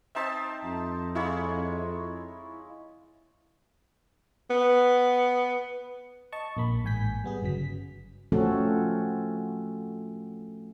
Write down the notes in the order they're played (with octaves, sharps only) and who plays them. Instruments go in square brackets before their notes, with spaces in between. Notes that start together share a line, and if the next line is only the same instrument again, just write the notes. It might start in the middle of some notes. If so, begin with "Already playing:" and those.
[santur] C4 D#4 C5 [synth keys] E5 A5
[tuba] F2
[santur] G#3 F4 C#5 [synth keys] E4
[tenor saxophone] B3
[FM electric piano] D#5 A5 C#6
A#1 A#3 B5
A1 G#2 G#5 G6 B6
G3 B3 G#4
G1 C#3 F#3 B6
[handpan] F3 A3 C4 C#4 F#4 A4